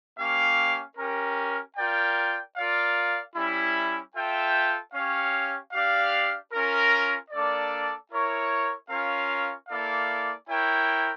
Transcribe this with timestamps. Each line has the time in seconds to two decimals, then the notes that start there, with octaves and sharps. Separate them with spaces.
0.18 A#3 C#4 G4 C#5 F5
0.97 C#4 G4 A#4
1.77 F4 A#4 D5 G5
2.56 F4 A#4 D5 F5
3.35 G3 C#4 E4
4.14 F4 A4 E5 G5
4.93 C#4 G4 C#5 F5
5.73 D4 G4 D5 F5
6.52 C#4 F4 A#4
7.30 A#3 D4 A4 D5
8.10 E4 A#4 C#5
8.89 C#4 F4 A#4 C#5 F5
9.69 A#3 E4 A4 D5 F5
10.48 E4 A#4 C#5 G5